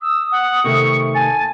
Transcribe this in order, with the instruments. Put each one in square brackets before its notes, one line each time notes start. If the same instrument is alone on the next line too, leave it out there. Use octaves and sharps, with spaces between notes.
[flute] D#6 [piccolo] E6
[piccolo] F#5
[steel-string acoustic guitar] C3 D#3 A3 [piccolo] C#6
[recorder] G#5 [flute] A5 [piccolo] A6